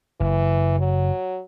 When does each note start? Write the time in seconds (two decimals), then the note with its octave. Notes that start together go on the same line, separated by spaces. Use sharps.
0.20 F#1 E3
0.79 F#3